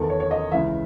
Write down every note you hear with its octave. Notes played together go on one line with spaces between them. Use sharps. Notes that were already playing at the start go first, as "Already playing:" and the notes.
Already playing: E2 D#3 A4
C#5
C#5
D#5
C#2 C#3 E3 E5